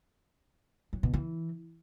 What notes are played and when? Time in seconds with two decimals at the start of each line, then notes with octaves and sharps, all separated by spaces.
0.93 F#3
1.03 B2
1.14 E3